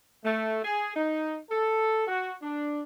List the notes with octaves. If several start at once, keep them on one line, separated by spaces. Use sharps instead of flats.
A3
G#4
D#4
A4
F#4
D4